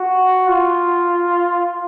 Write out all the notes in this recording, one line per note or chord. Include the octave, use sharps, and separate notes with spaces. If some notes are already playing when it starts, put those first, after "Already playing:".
Already playing: F#4
F4